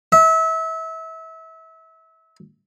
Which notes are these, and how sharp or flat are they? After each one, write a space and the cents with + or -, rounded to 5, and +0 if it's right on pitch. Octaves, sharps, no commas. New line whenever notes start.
E5 -30